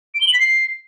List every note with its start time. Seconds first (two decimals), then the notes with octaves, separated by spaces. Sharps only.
0.15 D7
0.21 G7
0.27 F#7
0.33 B6
0.40 C7